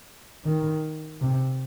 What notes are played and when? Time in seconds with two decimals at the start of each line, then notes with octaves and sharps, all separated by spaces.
0.45 D#3
1.21 C3